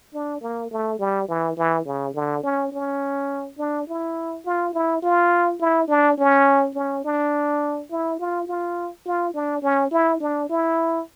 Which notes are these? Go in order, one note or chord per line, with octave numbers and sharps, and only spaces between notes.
D4
A#3
A3
G3
E3
E3
C#3
D3
C#4
C#4
D4
E4
F4
E4
F4
E4
D4
C#4
C#4
D4
E4
F4
F4
F4
D4
C#4
E4
D4
E4